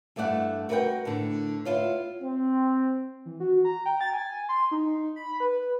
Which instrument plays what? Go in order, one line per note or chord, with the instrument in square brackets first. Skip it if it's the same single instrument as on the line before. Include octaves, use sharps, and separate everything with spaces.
[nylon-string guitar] G2 A3 E4 D5 F#5
F#4 A#4 B4 D5 F#5 G5
A2 D3
B3 E4 F4 C#5
[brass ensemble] C4
[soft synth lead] E3
F#4
A#5
G5
A6
G#5
C6
D#4
B5
B4